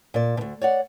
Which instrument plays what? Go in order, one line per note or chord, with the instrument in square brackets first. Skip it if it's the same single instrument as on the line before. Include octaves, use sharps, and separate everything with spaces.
[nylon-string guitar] A#2 D5
D2 B2
C#5 D5 F#5